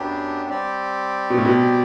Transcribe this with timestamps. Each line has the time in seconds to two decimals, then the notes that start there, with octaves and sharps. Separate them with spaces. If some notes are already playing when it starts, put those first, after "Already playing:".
Already playing: F#2 F#3 B3 D4 G4
0.49 G3 C4 G4 D5
1.30 B2
1.37 A2
1.45 B2